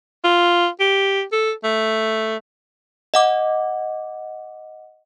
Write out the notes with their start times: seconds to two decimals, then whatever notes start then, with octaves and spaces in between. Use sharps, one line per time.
0.24 F4
0.80 G4
1.32 A4
1.64 A3
3.14 D#5 F#5 D6